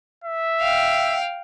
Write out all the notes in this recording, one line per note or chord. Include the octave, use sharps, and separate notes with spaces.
E5
F5 G5